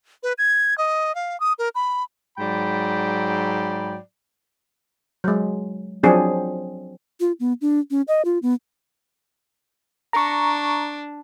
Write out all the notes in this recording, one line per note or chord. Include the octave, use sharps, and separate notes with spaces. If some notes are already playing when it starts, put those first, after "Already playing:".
B4
G#6
D#5
F5
D#6
A#4
B5
G#2 F#3 D5 G5 B5
F#3 G#3
F3 F#3 C4 D4 G#4
F4
B3
D4
C#4
D#5
F4
B3
D4 A#5 C#6